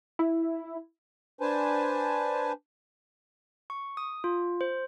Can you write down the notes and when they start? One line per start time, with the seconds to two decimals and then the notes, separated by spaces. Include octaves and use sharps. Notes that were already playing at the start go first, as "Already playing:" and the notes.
0.19 E4
1.41 D4 B4 C5 G#5 A5
3.70 C#6
3.97 D#6
4.24 F4
4.61 C5